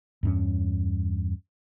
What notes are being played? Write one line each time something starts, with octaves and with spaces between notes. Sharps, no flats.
E2 G2 C#4